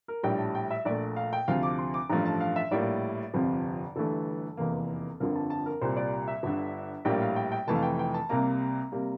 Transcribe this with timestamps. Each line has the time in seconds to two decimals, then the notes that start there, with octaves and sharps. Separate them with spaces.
0.08 A#4
0.23 A#1 A2 G3 G5
0.39 A5
0.55 G5
0.71 E5
0.85 A#1 A#2 A3 D5
1.16 F5
1.33 G5
1.48 D2 C3 F3 F5
1.63 D6
1.79 C6
1.94 D6
2.10 A1 G2 F3 A3 A#5
2.25 A5
2.40 F5
2.56 E5
2.71 A#1 A2 G3 A#3 D5
3.34 G1 F2 C3 F3
3.96 G1 G2 E3 A3 A4
4.57 F1 E2 E3 A#3
5.20 G1 F2 D3 F3 A#4
5.35 A5
5.50 A5
5.66 A#4
5.81 C2 A#2 G3 C5
5.97 D5
6.28 E5
6.43 G1 G2 D3
7.05 A#1 A2 G3 A#3 G5
7.22 F5
7.36 G5
7.52 G5
7.67 F1 F2 E3 A3 A5
7.75 F5
7.82 G5
7.99 G5
8.14 A5
8.29 C2 C3 G3 A#3 A#5
8.92 C3 G3 A#3